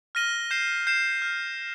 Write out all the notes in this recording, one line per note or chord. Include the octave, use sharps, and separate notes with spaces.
F6 A#6 D#7 G7
G6 C7 E7
G6 C7 E7
F6